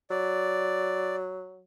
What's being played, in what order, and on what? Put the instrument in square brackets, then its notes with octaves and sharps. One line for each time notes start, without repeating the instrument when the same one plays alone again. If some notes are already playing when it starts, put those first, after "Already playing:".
[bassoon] F#3 [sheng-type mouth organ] D5